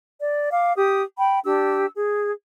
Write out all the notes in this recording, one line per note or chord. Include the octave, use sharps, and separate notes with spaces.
D5
F5 D6
G4 D#6
G5 B5
D4 G4 E6
G#4